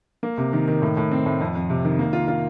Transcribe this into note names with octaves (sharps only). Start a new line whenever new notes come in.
A#3
C3
D#3
D#3
A2
A2
C4
A2
F2
F2
C3
D#3
A#3
F4
F4